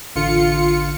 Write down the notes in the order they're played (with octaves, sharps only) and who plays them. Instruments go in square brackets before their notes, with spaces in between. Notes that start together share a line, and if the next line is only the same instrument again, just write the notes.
[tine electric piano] A1 D3 D4 [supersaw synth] F4 C#7